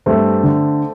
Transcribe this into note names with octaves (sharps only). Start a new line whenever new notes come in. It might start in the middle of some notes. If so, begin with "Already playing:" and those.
G2 A3 C4
D3